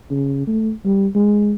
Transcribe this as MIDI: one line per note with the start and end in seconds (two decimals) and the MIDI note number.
0.10 0.46 49
0.47 0.72 57
0.85 1.07 55
1.15 1.54 56